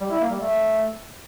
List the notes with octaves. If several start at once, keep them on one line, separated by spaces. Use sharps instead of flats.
G3
E4
A#3
G3
A3